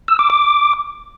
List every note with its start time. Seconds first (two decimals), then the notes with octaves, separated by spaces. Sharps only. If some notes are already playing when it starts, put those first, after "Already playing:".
0.08 E6
0.19 D6
0.30 D6